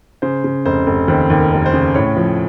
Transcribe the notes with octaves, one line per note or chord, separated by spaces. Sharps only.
C#3 C5
C#3
F1 C5
F1
D#2 C5
D#2
A#4
F1
C5
C#3
A2 C#5
F3